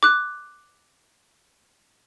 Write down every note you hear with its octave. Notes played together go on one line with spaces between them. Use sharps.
D6 F#6